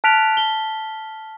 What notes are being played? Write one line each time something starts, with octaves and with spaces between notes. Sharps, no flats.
A5 F6 F#6 B6 D7 F7
G7